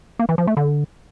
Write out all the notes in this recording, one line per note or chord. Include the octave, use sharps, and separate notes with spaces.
A#3
E3
F3
A3
D3